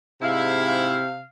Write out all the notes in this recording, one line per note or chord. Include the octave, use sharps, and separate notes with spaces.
G#2 C3 E4 F5